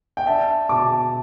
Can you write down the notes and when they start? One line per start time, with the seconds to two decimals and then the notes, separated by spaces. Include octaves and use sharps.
0.17 G5
0.27 D4 E5 A5
0.69 B2 A5 D6